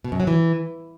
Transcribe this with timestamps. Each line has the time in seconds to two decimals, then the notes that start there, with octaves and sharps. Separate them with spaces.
0.04 B2
0.12 F#2
0.20 F#3
0.27 E3